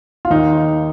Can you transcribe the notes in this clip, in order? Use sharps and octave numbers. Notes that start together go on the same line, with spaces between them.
F4
D#2 D#4